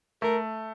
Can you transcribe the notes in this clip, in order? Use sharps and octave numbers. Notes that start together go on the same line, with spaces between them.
A3 A#4